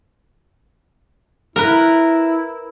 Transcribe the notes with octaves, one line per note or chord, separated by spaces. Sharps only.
E4 A#4 B4